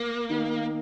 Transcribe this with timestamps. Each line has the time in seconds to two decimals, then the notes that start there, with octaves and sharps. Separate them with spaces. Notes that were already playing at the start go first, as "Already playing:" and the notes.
Already playing: A#3
0.30 D#3